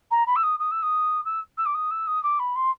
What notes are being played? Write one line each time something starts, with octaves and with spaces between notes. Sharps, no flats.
A#5
B5
E6
D#6
D#6
E6
D#6
E6
E6
D6
D#6
E6
D#6
D6
B5
C6